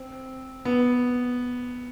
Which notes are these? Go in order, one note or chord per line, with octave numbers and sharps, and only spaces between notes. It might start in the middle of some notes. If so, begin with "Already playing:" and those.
Already playing: C4
B3